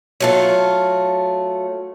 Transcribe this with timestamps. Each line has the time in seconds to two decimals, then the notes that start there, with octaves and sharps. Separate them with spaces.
0.20 F#3 A3 F4